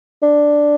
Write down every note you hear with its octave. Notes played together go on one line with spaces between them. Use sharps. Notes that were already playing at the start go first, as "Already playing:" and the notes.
D4